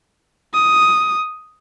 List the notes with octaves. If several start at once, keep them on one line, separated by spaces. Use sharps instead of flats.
D#6